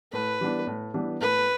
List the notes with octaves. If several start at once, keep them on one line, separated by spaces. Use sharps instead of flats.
A2 B4
E3 G3 B3 D4
A2
E3 G3 B3 D4
A2 B4